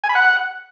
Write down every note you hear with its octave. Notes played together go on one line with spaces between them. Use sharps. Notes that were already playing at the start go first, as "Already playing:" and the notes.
G#5
B5
F#5